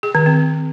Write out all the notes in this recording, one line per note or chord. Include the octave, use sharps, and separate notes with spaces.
G#4
D#3
C4